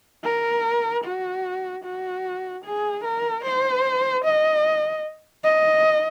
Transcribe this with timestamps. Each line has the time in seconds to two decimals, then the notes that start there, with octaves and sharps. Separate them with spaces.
0.24 A#4
1.04 F#4
1.83 F#4
2.64 G#4
3.04 A#4
3.44 C5
4.24 D#5
5.44 D#5